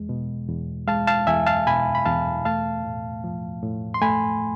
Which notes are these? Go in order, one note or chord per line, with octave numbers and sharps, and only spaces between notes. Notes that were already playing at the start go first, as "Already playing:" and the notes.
Already playing: E2 G#3
B2
E2
G#3 F5 A5
F5 A5
E2 E5 G#5
F5 A5
B2 G#5 B5
B5
E2 F5 A5
A3 F5 A5
A2
F3
A2
C6
A3 G#5 B5